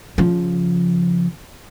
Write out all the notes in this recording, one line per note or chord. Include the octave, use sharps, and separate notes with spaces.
C#3 F3